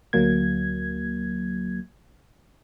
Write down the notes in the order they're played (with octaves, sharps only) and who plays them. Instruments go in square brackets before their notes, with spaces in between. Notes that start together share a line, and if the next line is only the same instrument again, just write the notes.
[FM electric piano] D2 F#3 A#3 G#6